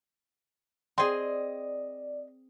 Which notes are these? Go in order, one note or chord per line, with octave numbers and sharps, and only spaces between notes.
C4 G#4 D5 D#5 C6